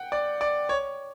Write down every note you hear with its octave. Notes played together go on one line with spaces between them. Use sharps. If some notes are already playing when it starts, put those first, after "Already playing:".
Already playing: F#5 G5
D5
D5
C#5